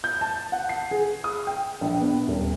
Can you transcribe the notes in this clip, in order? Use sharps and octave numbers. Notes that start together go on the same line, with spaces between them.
G6
A5
F#5
C7
G#4
D#6
G5
A#1
B3
D#1